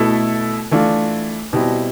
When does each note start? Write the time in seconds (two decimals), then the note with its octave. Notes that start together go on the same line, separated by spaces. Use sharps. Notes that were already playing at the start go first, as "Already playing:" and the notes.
Already playing: B2 A3 E4 A4
0.71 E3 A3 D4 F4
1.53 B2 G3 C4 E4